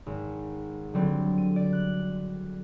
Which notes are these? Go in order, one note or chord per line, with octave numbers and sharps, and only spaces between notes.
G#1
D3 F#3 G3 C4
D#7
D5
F#6